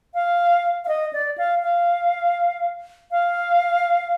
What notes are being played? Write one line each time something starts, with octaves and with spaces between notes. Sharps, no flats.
F5
F5
D#5
D5
F5
F5
F5